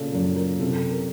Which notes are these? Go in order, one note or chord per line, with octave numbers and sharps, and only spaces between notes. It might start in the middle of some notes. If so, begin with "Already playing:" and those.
Already playing: A#2 C#3 A4
F#2 A4
A#4
C3 A4
A#4